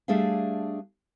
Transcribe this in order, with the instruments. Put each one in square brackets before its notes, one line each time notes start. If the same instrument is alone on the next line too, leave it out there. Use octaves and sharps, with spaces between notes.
[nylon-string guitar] G3 A3 D4 G#4 E5 F5